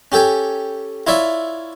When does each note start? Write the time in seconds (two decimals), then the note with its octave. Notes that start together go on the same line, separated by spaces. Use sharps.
0.12 C#4 G4 A4 G5 G#5
1.07 E4 F4 C#5 D5 E5